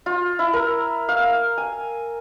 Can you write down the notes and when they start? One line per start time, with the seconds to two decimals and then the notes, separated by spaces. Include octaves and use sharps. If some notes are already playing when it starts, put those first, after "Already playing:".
0.06 F4
0.39 E4
0.53 A#4
1.09 F5
1.58 G#5